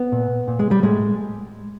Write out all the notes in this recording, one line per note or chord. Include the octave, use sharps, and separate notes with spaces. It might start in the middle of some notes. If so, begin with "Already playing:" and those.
Already playing: B3
A#2
A#2
G#3
G3
A2 G#3